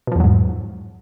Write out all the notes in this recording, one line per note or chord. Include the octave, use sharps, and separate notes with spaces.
E2 G#2 B2 F3 F#3